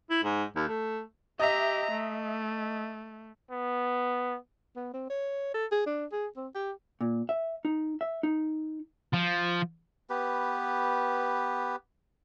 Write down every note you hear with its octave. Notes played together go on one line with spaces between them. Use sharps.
E4
G#2
D#2
A3
G4 D#5 E5 A#5
A3
B3
B3
C4
C#5
A4
G#4
D4
G#4
C4
G4
A#2
E5
D#4
E5
D#4
F3
B3 G4 B4